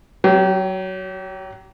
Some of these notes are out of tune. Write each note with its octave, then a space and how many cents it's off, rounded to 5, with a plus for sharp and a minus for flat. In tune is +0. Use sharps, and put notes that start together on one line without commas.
F#3 +20 G4 -30